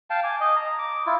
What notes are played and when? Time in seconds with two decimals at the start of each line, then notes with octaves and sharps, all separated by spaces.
0.10 F5 G5 A5
0.24 G#5 D6
0.40 D#5
0.56 A#5
0.78 D6
1.06 E4 F4